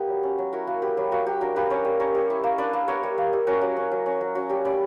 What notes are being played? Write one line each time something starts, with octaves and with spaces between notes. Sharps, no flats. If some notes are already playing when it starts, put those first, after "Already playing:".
Already playing: G3 A#3 B3 G4
F#3
C#4
F#3
E4 F#4 A#4
A#3 F#4
B3 G4 B4
F#3 G4
A#3 F#4 A#4
F#3 G4
D4 F#4 A#4
A#3 G4 B4
C#4 A#4 C#5
G3
C#4 A#4 C#5
G3
E4
A#3
D4 B4 D5
A#3
B3 A#4 C#5
G3
A#3
G3
C#4 F#4 A#4
F#3
C#4
F#3
C#4
F#3
C#4 F#4
G3 G4
C#4 B4 D5